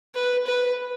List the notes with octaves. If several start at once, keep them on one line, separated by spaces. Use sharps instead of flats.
B4
B4